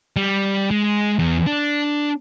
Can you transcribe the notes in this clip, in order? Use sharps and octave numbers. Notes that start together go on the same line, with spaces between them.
G3
G#3
E2
D4